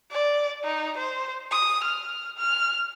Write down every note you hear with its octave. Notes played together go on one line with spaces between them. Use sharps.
D5
D#4
C5
D#6
F6
F6